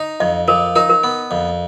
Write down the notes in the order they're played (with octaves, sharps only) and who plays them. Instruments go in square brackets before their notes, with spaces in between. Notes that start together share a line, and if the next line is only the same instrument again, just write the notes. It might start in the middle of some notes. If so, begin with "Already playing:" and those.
Already playing: [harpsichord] D#4
[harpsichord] F2 [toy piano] D#5
[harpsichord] F3 [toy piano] A#4
[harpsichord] D#4 [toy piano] A#4
[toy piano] A#4
[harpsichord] B3
F2